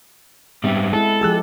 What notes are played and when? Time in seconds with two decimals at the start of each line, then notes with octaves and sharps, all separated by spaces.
0.64 G#2 G3 B3 C4 E5
0.93 G#3 E4 A4 D#5 F#5
1.21 F3 G#3 G4 G#4 E6 F#6